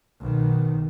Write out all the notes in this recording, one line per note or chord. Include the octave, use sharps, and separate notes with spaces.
B1 D#3